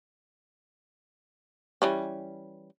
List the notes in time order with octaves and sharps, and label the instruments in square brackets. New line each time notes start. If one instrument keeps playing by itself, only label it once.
[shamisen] E3 G3 C#4